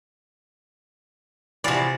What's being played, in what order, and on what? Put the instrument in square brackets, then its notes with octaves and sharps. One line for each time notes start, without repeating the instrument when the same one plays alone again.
[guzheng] C3 D5 [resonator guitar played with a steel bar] E3 F3 F#4